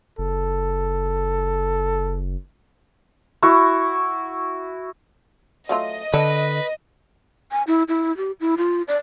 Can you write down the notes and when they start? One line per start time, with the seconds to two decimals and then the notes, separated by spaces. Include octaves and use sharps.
0.18 F#1 A4
3.43 E4 F#4 C#6
5.69 F#3 A3 F4 D#5
6.14 D3 D4 B4
7.52 G#5
7.67 E4
7.88 E4
8.17 G4
8.41 E4
8.58 F4
8.88 D5